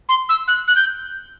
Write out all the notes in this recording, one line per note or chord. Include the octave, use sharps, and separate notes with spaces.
C6
E6
F#6
F#6
G6